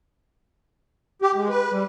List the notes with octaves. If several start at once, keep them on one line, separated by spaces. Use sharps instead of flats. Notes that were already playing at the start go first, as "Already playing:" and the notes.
G4
G#3
B4
G3